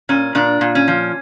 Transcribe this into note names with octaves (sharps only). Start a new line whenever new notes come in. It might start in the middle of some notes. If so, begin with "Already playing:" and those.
A#2 C#4
A#2 D4
A#2
C#4
F3